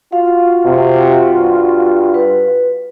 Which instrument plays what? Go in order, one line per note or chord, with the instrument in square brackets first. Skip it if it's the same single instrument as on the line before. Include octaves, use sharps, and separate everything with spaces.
[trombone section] F4 F#4 [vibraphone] F5
[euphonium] C3
G2
[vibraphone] B4